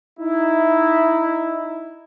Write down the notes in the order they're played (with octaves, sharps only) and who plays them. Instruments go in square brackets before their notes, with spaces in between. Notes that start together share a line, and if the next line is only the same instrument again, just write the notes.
[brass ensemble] D#4 E4